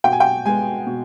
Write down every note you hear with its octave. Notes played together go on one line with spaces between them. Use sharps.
B2 G5
G#5
G5
G#3 B3 G#5
B2